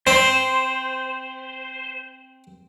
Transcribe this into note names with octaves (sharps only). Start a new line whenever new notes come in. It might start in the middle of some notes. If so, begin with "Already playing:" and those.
C4 C5